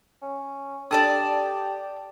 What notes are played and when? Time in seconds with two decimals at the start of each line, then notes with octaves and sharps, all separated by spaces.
0.22 C#4
0.91 D4 G4 A4 D5 G5 A5 D#6